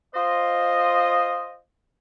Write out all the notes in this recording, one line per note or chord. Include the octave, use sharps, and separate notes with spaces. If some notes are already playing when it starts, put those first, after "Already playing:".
F4 C5 D#5